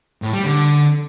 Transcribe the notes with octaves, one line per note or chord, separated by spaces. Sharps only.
A2
G3
D3